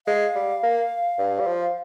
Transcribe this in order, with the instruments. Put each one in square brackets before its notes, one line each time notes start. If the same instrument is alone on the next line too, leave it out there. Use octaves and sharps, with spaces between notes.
[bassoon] G#3 [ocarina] F5
[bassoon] G3
A#3
G2
G3
F3